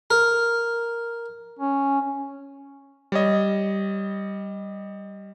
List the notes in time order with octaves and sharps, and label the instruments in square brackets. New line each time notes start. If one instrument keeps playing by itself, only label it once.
[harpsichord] A#4
[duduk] C#4
[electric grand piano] G3 C#5 D#5